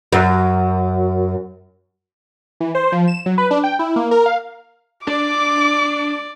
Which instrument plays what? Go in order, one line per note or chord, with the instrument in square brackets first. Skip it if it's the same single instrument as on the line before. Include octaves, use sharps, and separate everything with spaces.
[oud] F#2
[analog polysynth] E3
C5
F3
E7
F#3
B4
D4
G5
E4
A#3
A#4
F5
[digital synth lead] D4 [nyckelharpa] D5 [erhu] D6